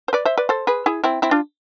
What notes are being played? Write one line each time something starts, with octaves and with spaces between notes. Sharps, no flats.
C5
B4 D5
C5 E5
B4 D5
A4 C5
G#4 B4
E4 G#4
C4 E4
C4 E4
D4 F4